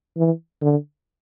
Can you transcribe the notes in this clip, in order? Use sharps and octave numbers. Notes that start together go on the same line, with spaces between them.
E3
D3